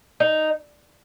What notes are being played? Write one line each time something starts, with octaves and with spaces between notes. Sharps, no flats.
D#4